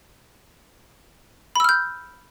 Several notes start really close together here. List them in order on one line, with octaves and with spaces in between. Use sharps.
B5 E6 F6 G6